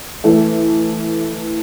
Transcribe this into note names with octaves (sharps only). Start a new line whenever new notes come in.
E3 A3